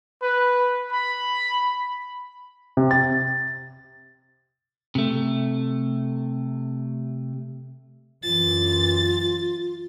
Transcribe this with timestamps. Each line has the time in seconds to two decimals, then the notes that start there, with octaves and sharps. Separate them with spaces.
0.23 B4
0.93 B5
2.77 C3
2.91 A6
4.95 C3 A3
8.23 F#2 E3 F4 A6